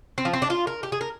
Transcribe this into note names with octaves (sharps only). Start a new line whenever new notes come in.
C4
F3
C4
D4
F4
A#4
G4
G#4
A#4